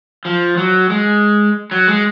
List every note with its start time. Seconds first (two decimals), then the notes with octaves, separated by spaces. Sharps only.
0.25 F3
0.57 F#3
0.90 G#3
1.71 F#3
1.87 G#3